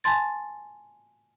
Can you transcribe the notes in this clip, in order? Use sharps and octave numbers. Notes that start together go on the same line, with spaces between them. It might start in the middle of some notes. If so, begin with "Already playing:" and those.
G#5 A5 C6 A6